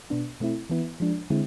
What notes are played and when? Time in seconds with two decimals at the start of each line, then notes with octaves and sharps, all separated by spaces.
0.10 B2 B3 D4
0.40 B2 A3 C4 E4
0.70 E3 B3 E4
1.00 F3 G#3 D4
1.30 D3 G#3 C4 E4